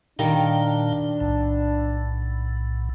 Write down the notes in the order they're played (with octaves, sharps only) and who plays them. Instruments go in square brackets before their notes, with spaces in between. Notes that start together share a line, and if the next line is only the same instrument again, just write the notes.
[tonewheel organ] A#2 F5 G5 [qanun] D#3 G3 A#4 [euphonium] D4
[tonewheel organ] B1 A2